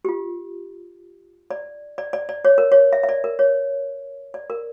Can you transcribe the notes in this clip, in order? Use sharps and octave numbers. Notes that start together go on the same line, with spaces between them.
G4
F4
D5
D5
D5
D5
C#5
A#4
C#5
E5
E5
D5
A#4
C#5
D5
A#4